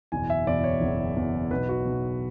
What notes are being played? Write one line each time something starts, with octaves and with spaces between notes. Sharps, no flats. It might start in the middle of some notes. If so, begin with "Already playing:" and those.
F#1 E2 B2 G#5
E5
F#1 E2 B2 D5
C#5
F#1 E2 B2
F#1 E2 B2
B1 B2 B4
F#4
B1 B2